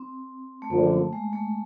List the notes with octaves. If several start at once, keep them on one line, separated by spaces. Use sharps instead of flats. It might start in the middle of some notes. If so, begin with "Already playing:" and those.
Already playing: C4
A3
F#2 D3 F3 A#3
G#3
A3